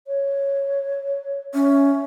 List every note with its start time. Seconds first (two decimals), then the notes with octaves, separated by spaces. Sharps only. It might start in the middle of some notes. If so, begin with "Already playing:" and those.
0.07 C#5
1.54 C#4 E5